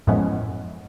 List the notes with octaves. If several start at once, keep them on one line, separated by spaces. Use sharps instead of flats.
F#2 A2 F3 G#3 B3 C#4